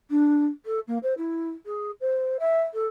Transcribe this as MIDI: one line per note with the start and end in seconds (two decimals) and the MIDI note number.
0.10 0.45 62
0.65 0.79 69
0.87 0.98 58
1.03 1.13 72
1.17 1.50 64
1.66 1.91 68
2.01 2.37 72
2.39 2.61 76
2.74 2.86 69